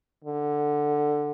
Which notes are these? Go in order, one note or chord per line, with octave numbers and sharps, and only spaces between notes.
D3